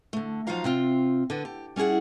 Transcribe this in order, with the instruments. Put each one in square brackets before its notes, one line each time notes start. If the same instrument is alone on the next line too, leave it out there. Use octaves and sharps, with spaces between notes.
[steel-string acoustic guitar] D3 A3
F3 F#3 D#4 F4 F5 A#5
C3 C4 F4
D3 B3
G4
G3 C#4 E4 G#4 F#5